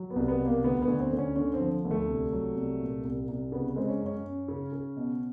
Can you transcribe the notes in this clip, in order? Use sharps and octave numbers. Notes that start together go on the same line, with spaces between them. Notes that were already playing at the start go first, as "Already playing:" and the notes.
Already playing: F#3
B3
C2
B3
B2
A#3
D2 B3
B3
D2
C4
D2
C#4
D3 C#4
C4
F3
D2
A3
C2
F#3
C2
A#2
C2
C2
C#3 B3
G#3 C4
C#4
F#2
C#4
F#2
C#3
C#3
B2